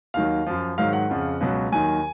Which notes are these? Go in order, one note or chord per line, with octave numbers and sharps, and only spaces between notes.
D#2 D#3 F#3 F5
F#2 F3
G#2 D#3 F#3 F5
F#5
F2 C#3 F3
C#2 B2 F#3
D#2 D#3 F#3 G#5